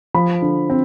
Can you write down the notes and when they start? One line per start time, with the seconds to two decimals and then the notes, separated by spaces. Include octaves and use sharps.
0.14 F3 B5
0.42 D3
0.70 C4